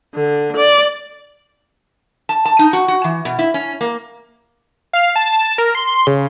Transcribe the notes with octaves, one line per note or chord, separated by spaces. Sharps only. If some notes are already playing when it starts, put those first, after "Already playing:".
D3
D5
A5
A5
D#4
F#4
F#4
E3
B2
E4
C#4
A#3
F5
A5
A#4
C6
C#3